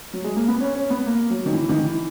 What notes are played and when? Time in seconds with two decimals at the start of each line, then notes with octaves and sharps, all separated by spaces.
0.13 F#3
0.24 G#3
0.36 A#3
0.48 B3
0.60 C#4
0.75 C#4
0.90 B3
1.06 A#3
1.30 F#3
1.46 D#3
1.53 E3
1.69 D#3
1.84 E3